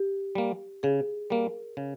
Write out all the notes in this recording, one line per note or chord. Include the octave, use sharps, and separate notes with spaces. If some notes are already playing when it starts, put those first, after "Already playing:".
Already playing: G4
G3 A#3
C#3 G#4
G3 A#3 A#4
C#3